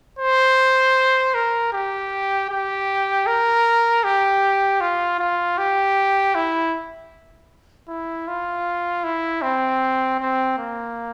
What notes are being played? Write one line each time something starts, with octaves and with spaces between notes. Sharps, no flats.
C5
A#4
G4
G4
A#4
G4
F4
F4
G4
E4
E4
F4
E4
C4
C4
A#3